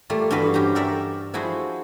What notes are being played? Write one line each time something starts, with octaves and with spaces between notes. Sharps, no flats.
G3 A3 A#3 F4
G2 D3 E3 G3 F#4 B4
C#4 G4 C5 A#5
G4 A4 A#4 D5 E5
F3 E4 F#4 G#4 C5